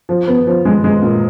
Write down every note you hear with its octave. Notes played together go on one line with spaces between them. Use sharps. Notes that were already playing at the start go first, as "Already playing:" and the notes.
F3
B3
F3
G#3
G#3
A#2